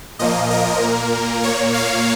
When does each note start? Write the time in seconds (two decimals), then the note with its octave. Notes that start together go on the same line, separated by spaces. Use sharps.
0.19 A#2 F3 A#3 D#5
0.51 A#4
0.82 A#2 A#3
1.43 A#2 A#3 C#5
1.74 F5